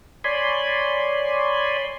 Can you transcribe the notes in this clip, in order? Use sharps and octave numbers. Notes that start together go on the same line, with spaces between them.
C#5 D5 G#5 B5 C6